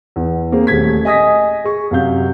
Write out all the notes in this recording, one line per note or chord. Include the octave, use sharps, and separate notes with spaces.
E2
A#3 C4 G#4
D#1 A3 G#4 G#6 B6
D#5 G#5 D#6 A#6 B6
G#4 C#6
F#2 C3 F5 G6